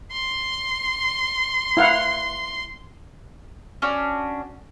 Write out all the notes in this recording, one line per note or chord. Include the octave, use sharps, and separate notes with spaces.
C6
E4 F5 F#5
C#4 D4 F#4